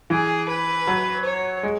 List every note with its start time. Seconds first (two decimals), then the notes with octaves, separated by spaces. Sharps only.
0.10 E3 G#4
0.49 B4
0.87 F#3
1.25 C#5
1.63 G#3